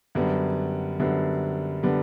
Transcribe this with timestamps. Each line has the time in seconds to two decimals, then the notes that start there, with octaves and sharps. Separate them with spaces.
0.15 F#2 D3 G3 B3
1.00 F#2 D3 G3 B3
1.83 D3 G3 B3